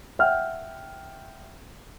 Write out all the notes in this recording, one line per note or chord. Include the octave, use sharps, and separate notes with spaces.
E5 F#5 G5 F6